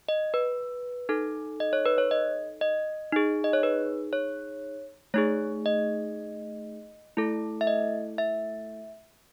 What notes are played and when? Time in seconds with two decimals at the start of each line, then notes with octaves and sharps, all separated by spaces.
0.09 D#5
0.34 B4
1.09 D#4 A4
1.60 D#5
1.73 C#5
1.86 B4
1.98 C#5
2.11 D#5
2.61 D#5
3.12 D#4 G#4
3.44 D#5
3.53 C#5
3.63 B4
4.13 C#5
5.14 A3 D#4 G#4 C#5
5.66 D#5
7.17 A3 E4 A4
7.61 E5
7.67 D#5
8.18 E5